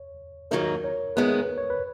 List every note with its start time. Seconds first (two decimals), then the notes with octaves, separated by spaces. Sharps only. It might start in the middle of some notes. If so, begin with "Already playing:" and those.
Already playing: C#5
0.51 G#2 D#3 F#3 A#3 D#4 A#4
0.84 C#5
1.16 D#3 G#3 B3 B4
1.58 C#5
1.70 B4